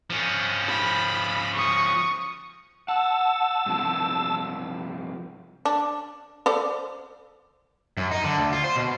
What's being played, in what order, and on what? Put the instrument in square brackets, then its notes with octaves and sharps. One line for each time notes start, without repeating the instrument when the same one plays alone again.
[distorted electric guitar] F3 C#4
[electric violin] B5
C#6 D#6
[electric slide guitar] F#5 [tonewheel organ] A5 E6
[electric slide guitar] G2 C3 F3
[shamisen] D4
A4 C5 D5
[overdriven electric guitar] F#2
D#4
D3
D2
F4
C5
B2